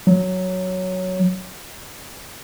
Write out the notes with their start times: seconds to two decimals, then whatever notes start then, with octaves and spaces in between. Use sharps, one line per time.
0.07 F#3